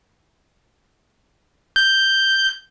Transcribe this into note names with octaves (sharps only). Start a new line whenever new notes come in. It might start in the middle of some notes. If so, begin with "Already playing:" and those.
G6